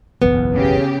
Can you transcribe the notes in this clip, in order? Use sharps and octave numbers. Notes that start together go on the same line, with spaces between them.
F#1 B1 E2 B3
C#3 G4